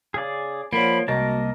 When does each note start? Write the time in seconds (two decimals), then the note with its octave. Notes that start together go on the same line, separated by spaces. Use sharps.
0.14 C#3 G#4 D5
0.73 F3 A#3 C#5 D5 F#5 B5
1.08 C2 G#3 A#3 F#4 A#4 D#5 A5